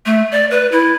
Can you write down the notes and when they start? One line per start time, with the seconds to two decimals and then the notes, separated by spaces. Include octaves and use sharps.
0.06 A3
0.32 D5
0.51 B4
0.72 E4